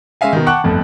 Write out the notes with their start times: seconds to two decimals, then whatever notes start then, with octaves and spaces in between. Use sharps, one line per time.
0.21 G#3 C#4 E5 F5 G#5
0.33 B2 D#3
0.46 F#5 G5 A5 C#6 D6 F#6
0.64 G1 F2 A2